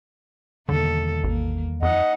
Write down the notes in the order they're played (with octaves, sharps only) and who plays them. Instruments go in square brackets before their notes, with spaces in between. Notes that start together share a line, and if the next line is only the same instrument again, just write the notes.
[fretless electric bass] E2 D#3 G3 [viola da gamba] B2 A#3 A4 [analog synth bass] D3
[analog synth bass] A1 [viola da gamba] A#3
[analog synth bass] F2 [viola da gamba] D#4 [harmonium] D#5 F#5